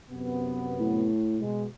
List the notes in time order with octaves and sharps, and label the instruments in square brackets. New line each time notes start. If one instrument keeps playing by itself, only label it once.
[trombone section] F#2 C3 B3
[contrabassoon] A2
[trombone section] B2 G#3